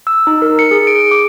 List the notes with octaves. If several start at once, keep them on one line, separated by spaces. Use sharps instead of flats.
E6
D#4
A#4
C#7
G#4
D7
D6